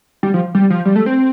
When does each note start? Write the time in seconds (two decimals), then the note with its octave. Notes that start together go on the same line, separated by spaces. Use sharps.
0.23 G3
0.34 F3
0.55 G3
0.70 F3
0.85 G3
0.96 A3
1.06 C4